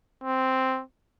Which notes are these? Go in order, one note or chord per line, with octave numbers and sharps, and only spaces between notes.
C4